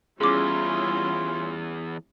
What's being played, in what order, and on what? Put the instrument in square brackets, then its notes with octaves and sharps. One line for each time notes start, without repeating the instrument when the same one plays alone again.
[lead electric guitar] E2 [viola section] G3 C#4 E4 [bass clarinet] F4 [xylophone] G#4 D6